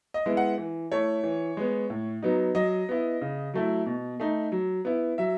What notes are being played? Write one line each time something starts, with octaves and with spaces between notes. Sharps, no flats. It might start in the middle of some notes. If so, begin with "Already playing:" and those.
D#5
G#3 B3 E4
F#5
E3
A3 E4 C#5
E3
G#3 B3
A2
F#3 B3 D#4
F#3 D#5
B3 E4
C#3
F#3 A3 E4
B2
A3 D#4
F#3
B3 E4
F#3 E5